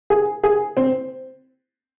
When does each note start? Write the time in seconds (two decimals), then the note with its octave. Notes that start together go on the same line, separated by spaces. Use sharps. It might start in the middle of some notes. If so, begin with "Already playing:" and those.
0.10 G#4
0.43 G#4
0.77 C4